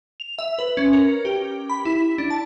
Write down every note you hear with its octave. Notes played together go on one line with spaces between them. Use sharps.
F7
E5
B4
C#4
A#4
G4
B5
E4
D4
A5